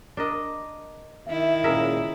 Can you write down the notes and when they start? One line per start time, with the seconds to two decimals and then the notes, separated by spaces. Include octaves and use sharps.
0.17 D4 A#4 D#5
1.28 D#3 E4 E5
1.64 C#2 A#2 C#3 G#4 A#4 E5